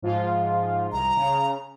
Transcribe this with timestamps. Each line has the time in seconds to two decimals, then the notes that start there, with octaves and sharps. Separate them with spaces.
0.02 G#2 F3 F4
0.92 C2 A#5
1.17 C#3